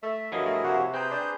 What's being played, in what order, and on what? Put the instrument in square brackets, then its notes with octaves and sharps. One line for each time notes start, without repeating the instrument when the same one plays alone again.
[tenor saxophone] A3 [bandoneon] E5
[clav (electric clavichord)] G2 F3 F#3 [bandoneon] E4 G#4 A#4 [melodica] D#5
[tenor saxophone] A3
[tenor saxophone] C3 [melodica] A#3 F#4 F#5
[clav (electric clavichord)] C4 G5 [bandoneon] G#4 G6 [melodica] B4 C5 A#5
[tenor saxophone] D4